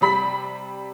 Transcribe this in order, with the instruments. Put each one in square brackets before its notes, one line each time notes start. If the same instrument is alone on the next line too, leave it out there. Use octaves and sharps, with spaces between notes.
[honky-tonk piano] C3 G3 B5 B6